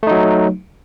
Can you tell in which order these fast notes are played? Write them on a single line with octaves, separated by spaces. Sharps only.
A3 D#4 F#3